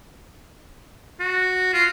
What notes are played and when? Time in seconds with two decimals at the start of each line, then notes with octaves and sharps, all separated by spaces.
1.20 F#4
1.73 F4